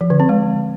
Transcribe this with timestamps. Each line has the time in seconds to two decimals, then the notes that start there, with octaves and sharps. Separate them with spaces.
0.01 F3
0.10 D3
0.20 C4
0.29 G#3